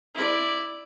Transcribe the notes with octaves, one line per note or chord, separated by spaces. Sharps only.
E4 D5